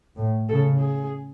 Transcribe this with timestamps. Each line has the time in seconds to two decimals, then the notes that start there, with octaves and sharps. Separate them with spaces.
0.18 A2
0.49 C#3 A4
0.79 G#4